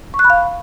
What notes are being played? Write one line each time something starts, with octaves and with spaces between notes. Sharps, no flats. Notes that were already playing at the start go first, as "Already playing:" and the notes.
C#6
F#6
B5
F5